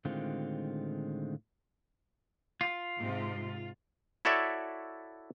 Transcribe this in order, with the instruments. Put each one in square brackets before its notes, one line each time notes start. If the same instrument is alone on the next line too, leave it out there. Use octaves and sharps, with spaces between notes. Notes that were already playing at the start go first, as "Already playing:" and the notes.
[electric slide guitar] A2 D3 D#3 G#3 C4 F4
F4
[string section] G#2 C3
[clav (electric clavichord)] E4 F#4 A4 C#5 D5 E5